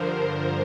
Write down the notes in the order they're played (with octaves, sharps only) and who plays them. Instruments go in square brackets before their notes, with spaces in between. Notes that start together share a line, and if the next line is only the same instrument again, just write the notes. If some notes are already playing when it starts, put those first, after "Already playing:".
Already playing: [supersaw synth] G2 D3 F3 [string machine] A#4 C5
[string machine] A#4 C5